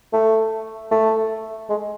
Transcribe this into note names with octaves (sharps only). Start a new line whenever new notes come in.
A3
A3
G#3